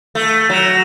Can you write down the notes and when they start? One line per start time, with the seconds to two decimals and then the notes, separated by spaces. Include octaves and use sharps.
0.15 A3
0.50 F#3